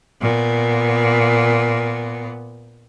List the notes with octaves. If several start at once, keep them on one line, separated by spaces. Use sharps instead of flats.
A#2 B3